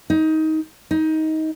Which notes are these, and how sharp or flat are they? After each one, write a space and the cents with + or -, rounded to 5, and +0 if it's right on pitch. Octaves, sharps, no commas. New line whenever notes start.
D#4 +20
D#4 +20